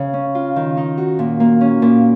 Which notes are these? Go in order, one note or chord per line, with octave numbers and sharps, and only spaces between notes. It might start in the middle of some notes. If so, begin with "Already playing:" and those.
Already playing: C#3
C#4
F4
D#3
D#4
F#4
A#2
A#3
C#4
A#2